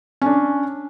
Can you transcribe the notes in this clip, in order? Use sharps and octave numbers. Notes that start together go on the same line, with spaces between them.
C#4 D4